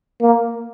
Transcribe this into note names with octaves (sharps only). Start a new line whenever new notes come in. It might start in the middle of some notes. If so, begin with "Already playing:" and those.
A#3